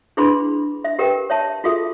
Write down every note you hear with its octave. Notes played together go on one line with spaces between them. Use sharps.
D4 E4 G#4 B4 B5 C6
E5
G4 A#4 B4 G5
C#5 E5 A5
F4 F#4 G#4 A4 E5